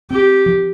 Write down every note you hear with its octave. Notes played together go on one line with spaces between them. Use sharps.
C4 G4
F3